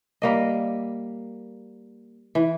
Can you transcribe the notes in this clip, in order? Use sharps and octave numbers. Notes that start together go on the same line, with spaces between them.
G3 A#3 D#5
E3